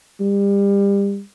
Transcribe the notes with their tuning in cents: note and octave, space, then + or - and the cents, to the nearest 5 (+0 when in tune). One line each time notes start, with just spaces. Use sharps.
G3 +30